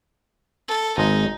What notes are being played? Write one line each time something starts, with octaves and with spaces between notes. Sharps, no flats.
A4
G#1 G#3 D#4 A#5